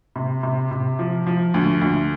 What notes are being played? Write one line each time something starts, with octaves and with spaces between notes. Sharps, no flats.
C3
C3
C3
F3
F3
D2
D2